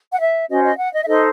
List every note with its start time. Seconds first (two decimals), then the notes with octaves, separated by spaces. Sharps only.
0.14 F#5
0.20 E5
0.50 C#4 F#4 C5 D#5
0.64 D#5
0.79 F#5
0.94 D#5
1.02 E5
1.08 D#4 A4 C5 D#5